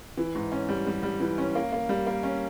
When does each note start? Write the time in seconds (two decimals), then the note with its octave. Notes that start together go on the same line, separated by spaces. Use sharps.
0.17 E3
0.35 G#2
0.52 C#4
0.69 G3
0.87 G3
1.03 G3
1.20 E3
1.38 C#4
1.55 A#3
1.72 A#3
1.89 G3
2.06 A#3
2.23 C#4